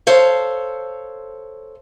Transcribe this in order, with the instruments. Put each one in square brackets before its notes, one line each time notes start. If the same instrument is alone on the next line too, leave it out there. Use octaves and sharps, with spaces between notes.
[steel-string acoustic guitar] A4 C5 C#5 F5